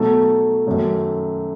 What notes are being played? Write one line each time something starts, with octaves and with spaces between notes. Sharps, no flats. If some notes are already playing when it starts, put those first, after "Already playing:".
Already playing: B2 F#3 A3 D#4 A4
F#2 D#3 F#3 A3